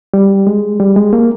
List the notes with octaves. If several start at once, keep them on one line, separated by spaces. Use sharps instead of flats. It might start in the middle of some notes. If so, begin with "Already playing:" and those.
G3
G#3
G3
G#3
A#3